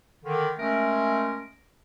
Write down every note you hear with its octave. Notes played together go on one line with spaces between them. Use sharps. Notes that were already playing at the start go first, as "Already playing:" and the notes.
D3 D#3
G#3 A3 C#4 A#4